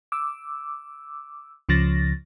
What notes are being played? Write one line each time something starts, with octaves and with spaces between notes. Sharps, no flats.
D6 E6
C#2 C#3 F3 A6 A#6